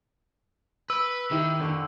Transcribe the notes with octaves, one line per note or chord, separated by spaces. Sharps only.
B4 E6
D#3 D#4 E4 G4
F2 D3 C#6